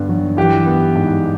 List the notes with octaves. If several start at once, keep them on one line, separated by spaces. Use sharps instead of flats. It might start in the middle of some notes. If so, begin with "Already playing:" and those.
Already playing: G2 D3 B3
F#3
E3 G4
B3
G#2